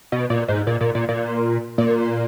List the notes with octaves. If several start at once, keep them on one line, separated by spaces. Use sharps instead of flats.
B2
A#2
G#2
A#2
A#2
A#2
A#2
A#2